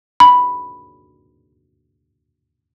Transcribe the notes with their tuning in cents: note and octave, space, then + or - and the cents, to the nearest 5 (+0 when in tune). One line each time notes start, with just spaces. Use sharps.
B5 +0